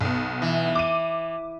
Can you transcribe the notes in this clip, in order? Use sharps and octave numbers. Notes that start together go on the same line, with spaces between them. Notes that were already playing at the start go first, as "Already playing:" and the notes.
B1 B3
E3
D6 D#7